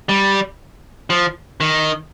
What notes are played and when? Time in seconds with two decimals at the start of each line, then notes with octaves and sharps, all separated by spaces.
0.09 G3
1.10 F3
1.61 D#3